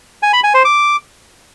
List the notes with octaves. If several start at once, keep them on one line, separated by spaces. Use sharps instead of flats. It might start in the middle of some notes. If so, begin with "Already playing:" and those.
G#5
B5
G#5
C5
D6